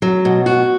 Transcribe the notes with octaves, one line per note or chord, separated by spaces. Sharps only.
F#3
B2
F#4